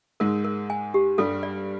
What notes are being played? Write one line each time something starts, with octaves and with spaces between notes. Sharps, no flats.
G#2 G#3 A#4
A#4
G#5
G4
G2 G3 A4
D5